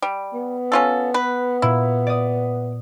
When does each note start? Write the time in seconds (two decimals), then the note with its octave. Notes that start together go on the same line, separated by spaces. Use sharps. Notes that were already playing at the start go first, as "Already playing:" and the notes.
0.02 G3
0.34 B3
0.72 C#4 F4 A4
1.14 B4
1.62 A#2 E4
2.07 D5 D#6